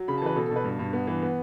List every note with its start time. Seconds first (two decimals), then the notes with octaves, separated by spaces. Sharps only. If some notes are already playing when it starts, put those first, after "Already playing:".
Already playing: F#3
0.08 C#3 B5
0.17 A5
0.22 E3 B4
0.36 B2 A4
0.46 A4
0.51 B2 B4
0.64 G2
0.79 G2
0.93 B3
1.07 E3
1.22 B3